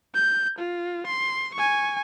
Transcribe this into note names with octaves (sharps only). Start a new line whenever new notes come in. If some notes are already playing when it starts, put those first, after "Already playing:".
G6
F4
C6
G#5 C#6